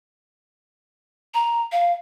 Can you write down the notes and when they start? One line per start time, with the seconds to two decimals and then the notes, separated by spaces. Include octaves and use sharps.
1.34 A#5
1.72 F5